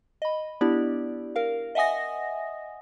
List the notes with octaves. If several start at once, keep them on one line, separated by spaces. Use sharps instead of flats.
D#5 B5
B3 D4 E4 G4 D5
A#4 F5
D#5 E5 F#5 G#5 D#6 A#6